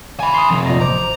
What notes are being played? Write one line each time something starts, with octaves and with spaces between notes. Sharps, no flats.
G#5 B5
C6 D#6
F2 C3
A#2 D#5 A#5
A1 C5 A#5 D6